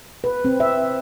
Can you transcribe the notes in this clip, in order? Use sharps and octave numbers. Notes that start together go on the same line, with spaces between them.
B4
C4
E5